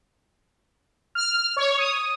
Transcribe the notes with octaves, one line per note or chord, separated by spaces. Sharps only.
F6
C#5
D#6